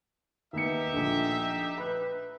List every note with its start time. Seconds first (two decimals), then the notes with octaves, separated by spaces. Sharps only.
0.53 D#2 B3 D#4 G4 E5 C#7
0.92 A#1 D3
1.78 B4 F#6